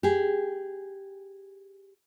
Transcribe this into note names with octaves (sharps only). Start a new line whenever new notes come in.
G4 G#4